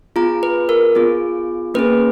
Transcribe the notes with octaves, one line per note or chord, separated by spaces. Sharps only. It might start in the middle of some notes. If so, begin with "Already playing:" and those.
B3 F4 G#4 A#5
B4
A#4
B3 F4 G#4
A#3 C#4 G#4 B4